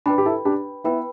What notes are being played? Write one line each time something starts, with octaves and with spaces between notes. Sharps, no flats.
D4 B4 G5 B5
G4
E4 A4
D4 G4
B3 E4 B4 G5 B5